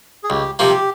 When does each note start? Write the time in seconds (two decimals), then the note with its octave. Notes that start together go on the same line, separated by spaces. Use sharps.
0.24 G#4
0.30 C#2 G4
0.59 C3 F3 A#3
0.70 G4